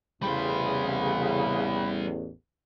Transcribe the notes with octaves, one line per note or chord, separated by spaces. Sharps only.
A1 E2 C#3 G3 C5 B5